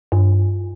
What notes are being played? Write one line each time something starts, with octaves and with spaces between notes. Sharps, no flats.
G2